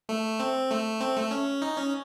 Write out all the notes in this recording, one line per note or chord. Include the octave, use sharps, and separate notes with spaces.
A3
C4
A3
C4
A3
C#4
D#4
C#4